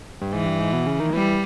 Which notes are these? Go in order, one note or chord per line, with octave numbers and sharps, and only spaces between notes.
G2
G#2 E3
G2
G#2
B2
C#3
D#3
E3 G3